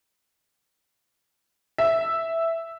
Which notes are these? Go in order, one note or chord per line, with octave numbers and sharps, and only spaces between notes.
E5